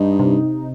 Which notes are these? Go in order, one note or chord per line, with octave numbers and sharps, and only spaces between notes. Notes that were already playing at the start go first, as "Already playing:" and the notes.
Already playing: G2 D#4
C3